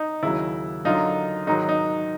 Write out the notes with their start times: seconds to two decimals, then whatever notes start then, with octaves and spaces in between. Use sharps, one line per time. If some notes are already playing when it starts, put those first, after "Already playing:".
Already playing: D#4
0.23 D#2 C#3 F#3 E4
0.85 F#2 D3 F#3 D#4 F4
1.47 G#2 D#3 F#3 D#4
1.69 D#4